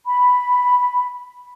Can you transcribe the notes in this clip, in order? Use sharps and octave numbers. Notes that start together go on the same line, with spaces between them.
B5